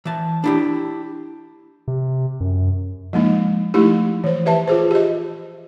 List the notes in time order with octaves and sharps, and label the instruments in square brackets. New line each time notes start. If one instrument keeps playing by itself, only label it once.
[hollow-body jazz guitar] E3 A5
D4 E4 G4
[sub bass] C3
F#2
[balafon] F3 G#3 A#3 D#4
F3 A3 D#4 E4 G4
E3 C5
G4 B4 E5 A5
F4 G#4 C5
G4 D#5